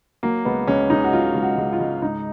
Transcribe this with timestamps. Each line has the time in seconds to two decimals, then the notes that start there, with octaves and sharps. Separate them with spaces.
0.23 F#3 A#3
0.45 C#2 B3
0.67 C#2 C#4
0.90 C#2 D#4
1.04 F#4
1.13 F#3 F4
1.35 C#2
1.43 F#4
1.57 C#2
1.73 F4
1.80 C#2
2.02 G#2 D#4